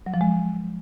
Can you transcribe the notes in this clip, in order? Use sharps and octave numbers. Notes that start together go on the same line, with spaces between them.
F#3
F3
G#3